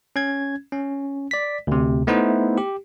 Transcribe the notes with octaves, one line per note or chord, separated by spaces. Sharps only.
C#4 G#6
C#4
D5 B6
D2 C3
A3 B3 D#4 E4 C5
G4